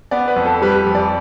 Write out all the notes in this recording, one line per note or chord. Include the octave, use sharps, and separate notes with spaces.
B3 D5
B4
F2
A4
G3 B4
F2
D5